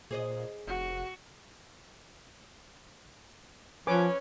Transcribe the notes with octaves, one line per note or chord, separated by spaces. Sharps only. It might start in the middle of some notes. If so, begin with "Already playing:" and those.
A#2 G#4 C5 D#5
F1 F#4
F3 C#4 B4 G#5 D6